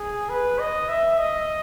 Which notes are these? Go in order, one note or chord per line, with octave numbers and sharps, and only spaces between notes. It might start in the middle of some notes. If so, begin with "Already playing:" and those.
Already playing: G#4
B4
D#5
E5
D#5